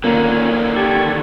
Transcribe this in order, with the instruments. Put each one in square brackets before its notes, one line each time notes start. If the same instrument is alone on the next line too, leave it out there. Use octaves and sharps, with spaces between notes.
[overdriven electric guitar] D3 D#3 [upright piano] A#3 [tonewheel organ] C#4 F4 G#5
[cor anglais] G4 [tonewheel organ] A5 C#6 G#6